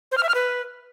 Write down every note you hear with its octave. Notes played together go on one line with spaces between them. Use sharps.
C5
F6
E5
F6
B4